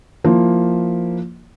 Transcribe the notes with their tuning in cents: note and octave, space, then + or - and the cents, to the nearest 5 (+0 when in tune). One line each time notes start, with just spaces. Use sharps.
F3 +0 A#3 +0 E4 +0